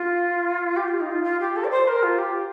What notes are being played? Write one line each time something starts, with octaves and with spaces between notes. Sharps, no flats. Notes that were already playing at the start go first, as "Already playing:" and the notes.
Already playing: F4
G4
F4
D#4
F4
F4
G4
A4
D5
C5
A#4
F4
G4